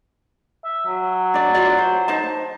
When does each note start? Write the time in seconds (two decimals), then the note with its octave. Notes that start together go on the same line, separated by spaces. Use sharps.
0.65 E5
0.86 F#3
1.34 D4 D5
1.54 F4 F#4 D5
1.78 C5
2.08 D#4 C5 A5